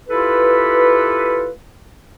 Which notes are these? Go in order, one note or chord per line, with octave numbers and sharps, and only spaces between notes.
E4 F4 G4 A4 B4